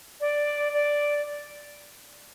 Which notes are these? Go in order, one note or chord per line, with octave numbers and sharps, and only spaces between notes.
D5
D5